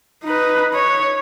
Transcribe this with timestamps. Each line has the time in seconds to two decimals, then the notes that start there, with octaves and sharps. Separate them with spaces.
0.24 D#4 B4
0.74 C#5